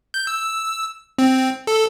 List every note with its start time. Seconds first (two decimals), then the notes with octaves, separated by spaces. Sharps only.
0.14 G6
0.27 E6
1.19 C4
1.67 A4